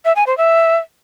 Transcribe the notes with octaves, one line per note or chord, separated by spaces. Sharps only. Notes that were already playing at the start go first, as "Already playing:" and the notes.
E5
G#5
C5
E5